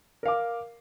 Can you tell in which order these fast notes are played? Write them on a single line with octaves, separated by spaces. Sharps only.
A#4 F5 D6